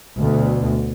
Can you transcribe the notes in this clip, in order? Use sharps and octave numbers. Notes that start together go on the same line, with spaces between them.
D2 B2